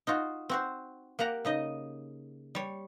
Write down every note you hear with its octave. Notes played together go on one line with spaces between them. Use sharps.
D#4 F4 F#4
C4 F#4 C5
A#3 G4 F#5 A#5
C#3 D#4 D#5
G3 C#5